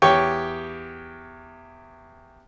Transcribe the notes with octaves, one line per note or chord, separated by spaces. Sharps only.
E2 G4 C#5 G5 C#6